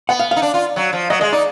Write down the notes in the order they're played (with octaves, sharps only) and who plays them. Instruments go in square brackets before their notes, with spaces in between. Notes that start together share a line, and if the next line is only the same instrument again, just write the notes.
[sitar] B3 [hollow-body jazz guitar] F#5
[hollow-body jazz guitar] F5
F5
[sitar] D#4
D4
F4
F#3
F3
[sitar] F#3 [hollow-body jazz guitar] D#5
[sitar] G#3 [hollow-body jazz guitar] D#5
[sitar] D#4 [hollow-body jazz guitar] D5